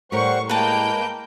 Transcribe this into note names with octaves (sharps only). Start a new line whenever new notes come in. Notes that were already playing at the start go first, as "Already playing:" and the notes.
A2 G3 G4 A#4 C5 F#5 C#6
G#3 A#3 B4 G5 A5 G6